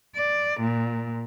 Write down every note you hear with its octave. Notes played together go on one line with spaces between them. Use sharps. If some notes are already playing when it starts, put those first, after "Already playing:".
D5
A#2